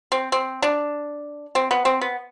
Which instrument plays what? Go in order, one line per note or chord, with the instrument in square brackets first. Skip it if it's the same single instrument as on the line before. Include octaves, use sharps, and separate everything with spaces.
[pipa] C4
C4
D4
C4
B3
C4
B3